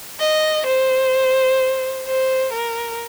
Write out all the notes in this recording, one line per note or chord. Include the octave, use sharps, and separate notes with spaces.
D#5
C5
C5
A#4